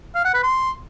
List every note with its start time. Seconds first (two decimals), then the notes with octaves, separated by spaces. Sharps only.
0.15 F5
0.25 F#5
0.34 B4
0.43 C6